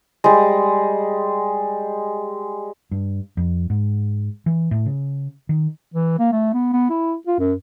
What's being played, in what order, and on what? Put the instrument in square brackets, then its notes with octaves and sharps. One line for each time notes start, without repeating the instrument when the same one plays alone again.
[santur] G3 G#3
[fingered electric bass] G2
F2
G#2
E3
A2
C#3
D#3
[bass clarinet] E3
A#3
A3
B3
B3
E4
F4
F#2